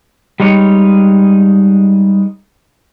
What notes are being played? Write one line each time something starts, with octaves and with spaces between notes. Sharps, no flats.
G3 G#3 D#4 C#5